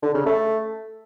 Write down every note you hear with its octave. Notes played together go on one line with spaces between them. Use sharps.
D3
C#3
A3